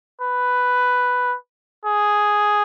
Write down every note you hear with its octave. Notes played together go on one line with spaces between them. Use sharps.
B4
G#4